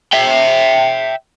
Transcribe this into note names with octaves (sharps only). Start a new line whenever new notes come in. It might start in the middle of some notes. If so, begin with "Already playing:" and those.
E5 G5